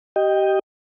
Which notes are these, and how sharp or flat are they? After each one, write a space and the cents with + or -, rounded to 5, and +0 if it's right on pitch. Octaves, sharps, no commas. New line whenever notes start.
G4 -25 D#5 +0 G5 +10